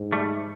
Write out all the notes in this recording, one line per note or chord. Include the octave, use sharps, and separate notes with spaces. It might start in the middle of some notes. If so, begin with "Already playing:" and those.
Already playing: G#2
G3 A3